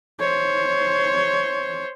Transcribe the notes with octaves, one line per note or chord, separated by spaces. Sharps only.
C5 C#5